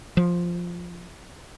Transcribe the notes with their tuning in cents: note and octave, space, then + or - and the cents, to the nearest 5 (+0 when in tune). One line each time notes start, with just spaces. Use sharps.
F3 +0